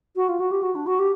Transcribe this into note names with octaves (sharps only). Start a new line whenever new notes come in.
F#4
F4
F#4
G4
F#4
D4
F#4
G4